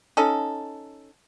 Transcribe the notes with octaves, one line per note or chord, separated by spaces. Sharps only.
C#4 D#4 A4